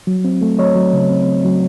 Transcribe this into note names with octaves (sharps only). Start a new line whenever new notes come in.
F#3
C4
A3
F#3 C#5 D#5
F#3
C#3
C4
C4
F#3